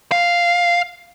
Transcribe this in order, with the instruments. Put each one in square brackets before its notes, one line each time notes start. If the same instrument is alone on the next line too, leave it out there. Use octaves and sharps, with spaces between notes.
[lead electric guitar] F5